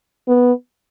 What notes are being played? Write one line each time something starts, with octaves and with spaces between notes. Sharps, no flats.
B3